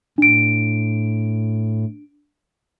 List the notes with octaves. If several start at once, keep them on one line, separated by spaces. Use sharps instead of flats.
A2 D4 D7